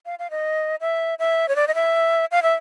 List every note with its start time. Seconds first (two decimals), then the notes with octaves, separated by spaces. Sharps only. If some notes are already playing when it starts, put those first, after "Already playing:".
0.06 F5
0.19 F5
0.31 D#5
0.81 E5
1.19 E5
1.49 C#5
1.56 D5
1.68 D#5
1.75 E5
2.32 F5
2.43 E5